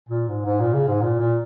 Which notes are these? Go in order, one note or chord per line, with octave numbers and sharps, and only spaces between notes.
A#2
G#2
G#2
A#2
C#3
G#2
A#2
A#2